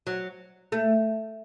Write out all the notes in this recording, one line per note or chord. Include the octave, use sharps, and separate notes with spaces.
F#3
A3